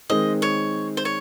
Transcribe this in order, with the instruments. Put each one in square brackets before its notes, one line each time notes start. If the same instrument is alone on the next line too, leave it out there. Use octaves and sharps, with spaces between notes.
[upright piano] D#3 G#3 C4 D#4 [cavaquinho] D#5
[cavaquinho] C#5
C5
C#5